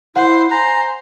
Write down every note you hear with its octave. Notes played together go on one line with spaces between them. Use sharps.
E4 C5 F#5
C5 G#5 A#5